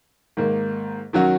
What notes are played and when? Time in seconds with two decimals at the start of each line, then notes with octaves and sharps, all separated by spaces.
0.37 G#2 D#3 A#3
1.13 D#3 F#3 C#4 F#4